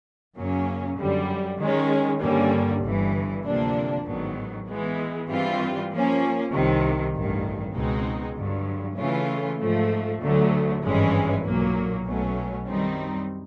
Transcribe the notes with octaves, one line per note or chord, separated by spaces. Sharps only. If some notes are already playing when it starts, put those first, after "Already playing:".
F#2 C#3 F#3 A#3 C#4
F#2 D3 G3
D#3 G#3 C#4
G2 D3 G3 A#3 C#4
G1 G2 E3
D2 C3 F3 A#3 D4
A1 G#2 D#3 F#3 B3
E3 G#3 B3
G2 E3 G3 C4 F4
F3 A#3 C#4
C2 C3 D#3
A1 G2 D#3
C#2 B2 G#3 C4 D#4
G2 D3 F#3
C#3 E3 A3 C#4 F4
G#2 F3 A3
D2 D3 F#3 A3
G#1 G2 E3 G#3 C#4
B1 A#2 F#3 A#3
B1 B2 F#3 A3 C#4
F#2 D#3 G3 C4 D#4